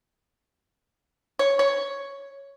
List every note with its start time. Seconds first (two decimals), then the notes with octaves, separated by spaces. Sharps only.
1.39 C#5
1.59 C#5